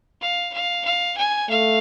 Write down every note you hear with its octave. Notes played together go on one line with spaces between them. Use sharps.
F5
F5
F5
G#5
A3 F5